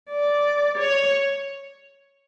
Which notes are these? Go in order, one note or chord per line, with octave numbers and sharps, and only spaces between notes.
D5
C#5